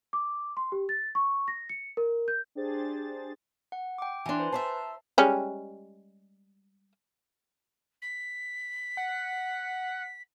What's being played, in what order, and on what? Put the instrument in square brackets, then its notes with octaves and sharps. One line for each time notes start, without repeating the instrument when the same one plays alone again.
[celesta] D6
C6
G4
A6
C#6
A#6
C#7
A#4
G6
[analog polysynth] D4 G4 G#4 C5 A6
[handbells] F#5
G5 D6
[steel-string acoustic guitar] E3 D4 [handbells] G#5 A#5 C6
[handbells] B4 C5
[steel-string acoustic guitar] C5 D5 E5 [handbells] A5 A#5 C7
[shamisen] G3 G#3 C#4
[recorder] B6
[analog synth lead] F#5